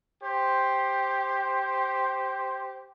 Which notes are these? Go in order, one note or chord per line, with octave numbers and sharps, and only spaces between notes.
G4 C5